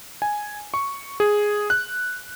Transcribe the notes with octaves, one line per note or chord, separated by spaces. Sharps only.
G#5
C#6
G#4
F#6